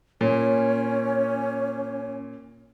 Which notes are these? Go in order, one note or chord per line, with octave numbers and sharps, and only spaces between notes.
A#2 C#4 C#5